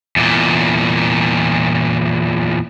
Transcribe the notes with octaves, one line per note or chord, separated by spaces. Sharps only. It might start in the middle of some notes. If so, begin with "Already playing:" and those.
E2 A#2